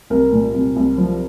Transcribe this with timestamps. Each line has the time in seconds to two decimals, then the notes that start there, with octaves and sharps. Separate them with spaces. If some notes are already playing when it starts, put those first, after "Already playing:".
0.10 C2 A#4
0.32 A#2
0.54 C2
0.76 C2
0.98 F3